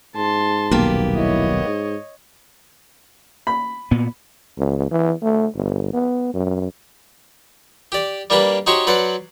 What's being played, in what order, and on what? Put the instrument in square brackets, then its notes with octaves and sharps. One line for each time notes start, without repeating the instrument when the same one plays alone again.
[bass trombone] G#2 [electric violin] A5 C6
[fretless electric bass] D#1 B1 [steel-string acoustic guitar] A#3 B3 G4
[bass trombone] E4 [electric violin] C#5 D#5
[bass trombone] G#2
[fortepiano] B5
[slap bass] A#2 B3
[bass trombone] C#2
E3
A3
G1
B3
F#2
[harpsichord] G4 D5
G3 A#3 D4 G4 B4
D#4 F#4 G4 C5 C#5
F#3 B4 C5 D5 F#5